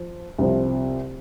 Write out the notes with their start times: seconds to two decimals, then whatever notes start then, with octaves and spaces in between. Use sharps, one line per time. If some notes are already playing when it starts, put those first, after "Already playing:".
Already playing: F3
0.38 C2 C3 F3